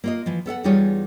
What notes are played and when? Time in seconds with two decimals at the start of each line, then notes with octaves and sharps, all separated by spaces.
0.04 A#3 F4 D#5
0.26 E3 F3
0.46 B3 A4 F5 F#5
0.64 E2 G3 D#4 F4 G#4 C#5